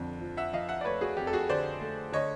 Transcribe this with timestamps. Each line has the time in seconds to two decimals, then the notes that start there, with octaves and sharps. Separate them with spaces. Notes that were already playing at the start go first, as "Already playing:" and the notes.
Already playing: F2 D3
0.21 F3
0.37 E5 F#5
0.53 F3 D#5 F5
0.69 E5 F#5
0.81 D5
0.84 A3 B4 C#5
1.01 F#4 G#4
1.17 F2 G4
1.27 A4
1.33 F#4 G#4
1.49 D3 C5 D5
1.81 A3
2.12 D3 C#5 D#5